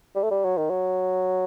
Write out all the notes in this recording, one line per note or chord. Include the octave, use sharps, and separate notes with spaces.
G3
A3
G3
F#3
D#3
F#3